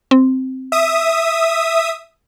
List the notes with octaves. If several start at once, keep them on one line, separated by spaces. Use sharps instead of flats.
C4
E5 D#6